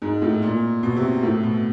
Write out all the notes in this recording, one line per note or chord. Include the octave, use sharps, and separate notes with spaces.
G#2
A2
A#2
B2
C3
A2
B2